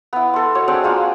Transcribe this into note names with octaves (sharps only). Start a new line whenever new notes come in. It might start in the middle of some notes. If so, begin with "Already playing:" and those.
B3 E4
A4 C6
F#4 C#5 D#5
C4 D4 G#4 D5
G#3 A#3 F4 F#4